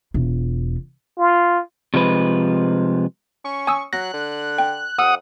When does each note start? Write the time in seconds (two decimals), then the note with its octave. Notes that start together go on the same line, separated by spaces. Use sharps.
0.14 E1 F4
1.18 F4
1.94 C3 F3 G#3 B4
3.45 C#4 C#6
3.67 G#5 D#6 E6
3.93 F#3 F#6 A#6
4.14 D3
4.58 G5
4.99 F2 F#5 D#6 E6